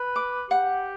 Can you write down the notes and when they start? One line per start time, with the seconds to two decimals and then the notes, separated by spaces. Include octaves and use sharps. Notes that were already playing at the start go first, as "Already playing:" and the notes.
Already playing: B4
0.16 D6
0.51 G4 F#5